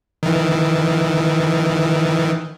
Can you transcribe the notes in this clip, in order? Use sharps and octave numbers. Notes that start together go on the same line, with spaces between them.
D#3 E3